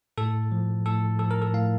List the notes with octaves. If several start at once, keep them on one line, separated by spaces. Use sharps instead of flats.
A2 A4
F3
A2 A4
F3 A4
A#4
A4
A2 F5